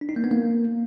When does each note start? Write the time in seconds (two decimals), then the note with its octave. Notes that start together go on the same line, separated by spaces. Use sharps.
0.01 D4
0.09 D#4
0.16 A#3
0.24 B3
0.31 A#3